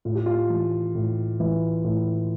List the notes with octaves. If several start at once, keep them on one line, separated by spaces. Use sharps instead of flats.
A2 F4
G4
F4
E3
A2
E3
A2